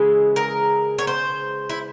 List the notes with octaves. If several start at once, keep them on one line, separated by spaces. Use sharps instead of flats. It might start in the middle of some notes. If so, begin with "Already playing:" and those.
Already playing: C#3 E3 G#3
A#4
C#5
C5
E4